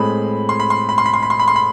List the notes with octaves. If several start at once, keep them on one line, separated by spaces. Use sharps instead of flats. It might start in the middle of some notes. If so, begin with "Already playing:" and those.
Already playing: A2 G#3 C4 B5
C6
B5
C6
B5
C6
B5
C6
B5
C6
B5
C6
B5